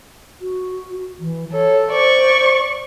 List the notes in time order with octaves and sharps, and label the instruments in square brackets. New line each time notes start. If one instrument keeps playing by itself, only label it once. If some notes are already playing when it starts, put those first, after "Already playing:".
[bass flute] F#4
E3
[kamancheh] A4 [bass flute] C#5
[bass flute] C5 [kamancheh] D5 C#6